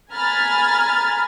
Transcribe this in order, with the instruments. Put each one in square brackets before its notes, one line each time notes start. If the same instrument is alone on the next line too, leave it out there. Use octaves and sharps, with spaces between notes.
[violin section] G#5 A#5 B5 F6 G#6 A6